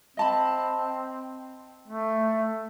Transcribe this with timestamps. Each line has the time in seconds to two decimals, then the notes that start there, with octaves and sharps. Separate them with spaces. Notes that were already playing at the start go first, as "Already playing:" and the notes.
0.17 C4 D#5 A5 B5
1.88 A3